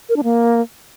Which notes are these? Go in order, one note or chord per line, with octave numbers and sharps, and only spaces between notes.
A#4
D4
A#3